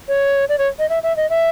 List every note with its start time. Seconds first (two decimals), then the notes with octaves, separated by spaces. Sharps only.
0.08 C#5
0.49 D5
0.58 C#5
0.79 D#5
0.89 E5
1.03 E5
1.16 D#5
1.30 E5